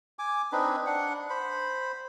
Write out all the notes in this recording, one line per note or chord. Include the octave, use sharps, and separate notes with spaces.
G#5 D6
C4 D4 D#4 B4
D4 F#5
C5 B5